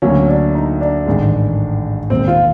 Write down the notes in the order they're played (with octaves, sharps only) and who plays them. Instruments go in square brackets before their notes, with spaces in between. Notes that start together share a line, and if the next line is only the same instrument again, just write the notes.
[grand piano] D2 D3 F#3 A#3 [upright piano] C#4
[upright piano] D4
D#4
D4
[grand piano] A1 G#2 D#3 G#3
[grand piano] E1 D#2 D#3 G#3 [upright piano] C4
[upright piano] F4